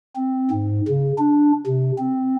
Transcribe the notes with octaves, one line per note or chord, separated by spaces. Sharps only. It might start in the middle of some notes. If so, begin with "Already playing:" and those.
C4
G#2
C#3
D4
C3
C4